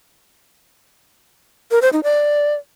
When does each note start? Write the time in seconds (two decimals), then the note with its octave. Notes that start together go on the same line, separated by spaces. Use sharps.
1.71 A#4
1.82 C5
1.93 D#4
2.03 D5